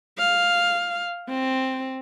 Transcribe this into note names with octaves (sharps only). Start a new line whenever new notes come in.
F5
C4